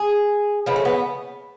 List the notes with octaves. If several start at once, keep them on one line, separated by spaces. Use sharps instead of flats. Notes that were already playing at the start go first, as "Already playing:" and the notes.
Already playing: G#4
C#3 F3 G#3 B3
A3
B3